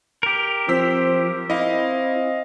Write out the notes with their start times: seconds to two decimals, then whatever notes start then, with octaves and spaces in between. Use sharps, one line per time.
0.23 G4 A#4
0.68 F3 C4 C5 E6 B6
1.50 C4 E4 D#5 F5